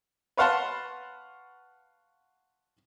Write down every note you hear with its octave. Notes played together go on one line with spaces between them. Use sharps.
B4 C#5 F5 F#5 A5 C6